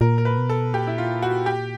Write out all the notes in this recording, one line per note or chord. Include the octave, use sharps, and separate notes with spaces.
A#2 A#4
A#4
B4
B2
A4
A#2 G4
E4
F4
F#4
G4